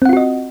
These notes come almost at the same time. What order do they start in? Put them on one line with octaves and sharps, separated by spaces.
C4 F#5 F4 F#4 D#5